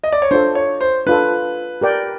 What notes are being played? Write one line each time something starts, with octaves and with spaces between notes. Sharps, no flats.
D#5
D5
C#5
D4 F4 A4 C5
C#5
C5
D4 F4 A4 B4
G4 A#4 D5 G5